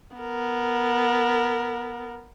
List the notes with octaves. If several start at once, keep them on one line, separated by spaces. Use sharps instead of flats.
B3 A#4